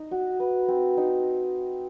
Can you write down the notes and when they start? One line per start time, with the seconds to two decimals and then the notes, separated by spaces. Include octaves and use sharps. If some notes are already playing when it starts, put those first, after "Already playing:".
Already playing: D#4
0.11 F#4
0.40 B4
0.68 C4
0.97 D#4